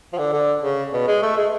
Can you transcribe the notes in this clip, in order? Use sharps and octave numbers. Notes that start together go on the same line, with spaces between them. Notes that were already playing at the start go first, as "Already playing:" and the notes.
F3
D3
D3
C#3
B2
G#3
A3
G#3